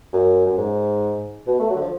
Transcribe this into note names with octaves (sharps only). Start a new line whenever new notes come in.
F#2
F#2
G#2
B2
A3
F#3
D3
F3